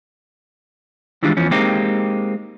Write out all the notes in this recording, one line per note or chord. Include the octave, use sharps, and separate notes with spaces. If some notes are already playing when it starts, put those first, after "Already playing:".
D#3 E3 G3 G#3 D4 F4
E2 E3 F3 C#4
G#3 A#3 C4 D#4 G4